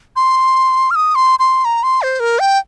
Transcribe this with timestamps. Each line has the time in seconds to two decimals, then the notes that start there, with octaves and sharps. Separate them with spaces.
0.16 C6
0.91 F6
0.95 D#6
1.15 C6
1.39 C6
1.65 A#5
1.83 C6
2.02 C5
2.20 A#4
2.39 G5